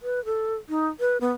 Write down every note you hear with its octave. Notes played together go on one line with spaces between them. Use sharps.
B4
A4
D#4
B4
B3